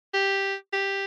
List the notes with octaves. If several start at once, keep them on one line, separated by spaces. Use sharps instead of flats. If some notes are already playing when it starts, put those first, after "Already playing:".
G4
G4